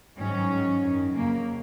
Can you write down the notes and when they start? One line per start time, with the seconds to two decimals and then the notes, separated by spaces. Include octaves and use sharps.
0.18 G#2 D#3 F#3 C#4
0.50 G#2 F#3
0.83 F#2 D#3 F#3
1.15 F2 C#3 F#3 A#3